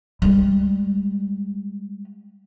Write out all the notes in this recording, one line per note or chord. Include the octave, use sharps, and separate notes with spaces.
G3 G#3